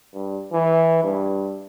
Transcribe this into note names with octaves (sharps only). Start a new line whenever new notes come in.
G2
E3
G2